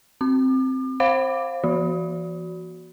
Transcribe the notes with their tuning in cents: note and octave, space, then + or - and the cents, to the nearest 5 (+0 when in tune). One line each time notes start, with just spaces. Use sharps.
C4 +0 D6 +40
C5 +25 F5 +0 D6 +0
E3 +45 F#4 +0